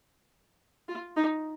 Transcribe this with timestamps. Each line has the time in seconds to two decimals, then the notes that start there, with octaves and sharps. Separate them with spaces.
0.88 F4
1.17 D#4